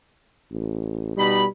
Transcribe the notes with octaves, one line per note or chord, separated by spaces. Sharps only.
A1
B2 G3 D#4 B5